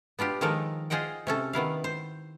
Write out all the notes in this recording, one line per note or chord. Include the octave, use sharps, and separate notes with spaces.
B3 D4 F4 G4
D#3 F3 G#3 D#4 A4 A#4
F4 G#4 C5 D#5 F#5 G5
C3 C#4 A4
D#3 B3 E4 F5
C5